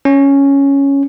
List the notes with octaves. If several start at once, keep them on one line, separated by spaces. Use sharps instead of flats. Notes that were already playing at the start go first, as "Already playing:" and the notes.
C#4